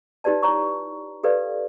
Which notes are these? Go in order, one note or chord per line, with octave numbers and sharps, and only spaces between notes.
D#4 F4 G4 B4 D5 A5
E4 C#5 A#5 C#6
G4 A4 B4 D5 F5